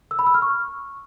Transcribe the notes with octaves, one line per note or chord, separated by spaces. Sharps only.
E6
B5
E6
F6
C#6